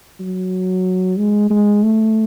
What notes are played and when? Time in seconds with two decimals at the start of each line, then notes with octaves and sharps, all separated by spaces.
0.20 F#3
1.18 G#3
1.50 G#3
1.83 A3